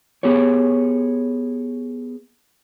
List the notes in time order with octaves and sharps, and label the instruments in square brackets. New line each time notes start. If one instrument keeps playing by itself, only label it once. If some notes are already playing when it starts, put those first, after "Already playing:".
[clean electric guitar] B3 G4 G#4 C#5